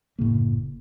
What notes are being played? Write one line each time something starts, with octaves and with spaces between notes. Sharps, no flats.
F#1 A2 C#3 A#3